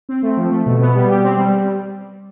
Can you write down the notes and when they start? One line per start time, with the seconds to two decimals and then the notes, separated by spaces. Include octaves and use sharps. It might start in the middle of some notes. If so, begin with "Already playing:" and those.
0.09 C4
0.22 A3
0.37 F3
0.51 A3
0.66 B2
0.81 B3
0.95 G3
1.10 G4
1.24 C4
1.38 G3